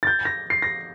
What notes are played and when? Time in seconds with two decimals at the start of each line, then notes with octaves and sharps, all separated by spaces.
0.03 A6
0.07 G6
0.25 A#6
0.50 C7
0.62 A#6